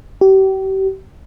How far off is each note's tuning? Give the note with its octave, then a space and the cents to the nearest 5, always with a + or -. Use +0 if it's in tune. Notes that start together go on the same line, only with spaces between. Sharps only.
G4 -35